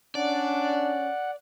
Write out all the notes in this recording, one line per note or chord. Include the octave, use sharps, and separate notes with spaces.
C#4 D4 D5 F#5